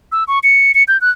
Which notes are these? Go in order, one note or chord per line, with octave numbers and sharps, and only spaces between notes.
E6
C#6
C#7
C#7
G6
F#6